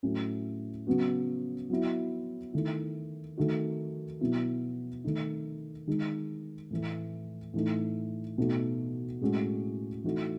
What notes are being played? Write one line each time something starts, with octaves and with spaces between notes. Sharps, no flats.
A2 F#3 C#4
C#3 F#3 B3 F#4
F#3 B3 E4
D#3 A3 E4
D#3 A3 D#4 F#4
B2 F#3 B3 E4
D#3 A3 D#4
D#3 G#3 D#4
A2 E3 A3
A2 E3 A3 D#4
B2 A3 D#4 F#4
A2 G#3 C#4 F#4
E3 A3 D#4 F#4